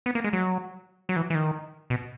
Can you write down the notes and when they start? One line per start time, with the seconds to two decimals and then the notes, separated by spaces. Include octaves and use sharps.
0.06 B3
0.15 A#3
0.24 G#3
0.33 F#3
1.09 F#3
1.16 E3
1.30 E3
1.35 D#3
1.90 B2